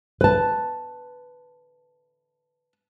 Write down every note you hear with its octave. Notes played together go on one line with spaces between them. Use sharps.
B4 A5